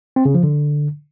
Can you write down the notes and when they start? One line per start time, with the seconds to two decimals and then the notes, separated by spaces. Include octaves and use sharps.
0.16 C4
0.25 C#3
0.34 F3
0.43 D3